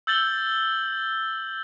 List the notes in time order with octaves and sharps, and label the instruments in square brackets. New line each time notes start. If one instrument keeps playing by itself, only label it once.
[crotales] E6 G6 A6 F#7 G7